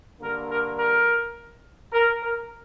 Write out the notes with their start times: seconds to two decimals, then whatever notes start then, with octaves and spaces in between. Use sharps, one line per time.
0.19 G2 D3 A#3 A#4
0.48 A#4
0.76 A#4
1.92 A#4
2.21 A#4